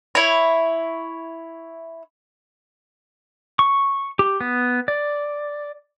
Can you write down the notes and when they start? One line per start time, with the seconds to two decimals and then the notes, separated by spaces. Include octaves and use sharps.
0.15 E4 C#5
3.59 C#6
4.19 G4
4.41 B3
4.88 D5